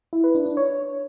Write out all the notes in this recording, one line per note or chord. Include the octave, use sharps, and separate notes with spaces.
E4
B4
D4
D4
C#5